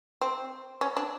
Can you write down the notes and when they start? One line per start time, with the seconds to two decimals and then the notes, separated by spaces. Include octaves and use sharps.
0.21 C4
0.81 C#4
0.97 D4